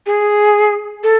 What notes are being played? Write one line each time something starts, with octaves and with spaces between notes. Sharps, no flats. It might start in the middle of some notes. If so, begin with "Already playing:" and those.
G#4
A4